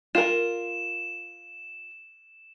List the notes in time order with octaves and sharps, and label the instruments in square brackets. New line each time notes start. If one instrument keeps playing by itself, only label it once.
[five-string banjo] F4 A#4 [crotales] E7